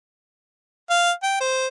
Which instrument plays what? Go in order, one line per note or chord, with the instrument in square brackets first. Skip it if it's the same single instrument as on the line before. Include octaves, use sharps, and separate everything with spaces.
[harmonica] F5
G5
C5